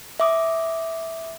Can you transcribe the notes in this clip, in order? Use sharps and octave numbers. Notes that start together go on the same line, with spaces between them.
E5 D6 D#6